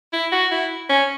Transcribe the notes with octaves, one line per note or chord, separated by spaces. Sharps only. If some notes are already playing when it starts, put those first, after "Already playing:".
E4
F#4
E4
C#4